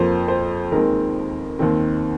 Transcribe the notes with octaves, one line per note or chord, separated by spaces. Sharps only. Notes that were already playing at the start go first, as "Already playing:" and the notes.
Already playing: F2 F3 A#3 C5
C5
D#2 D#3 G#3 C4 A#4
D#2 D#3 C4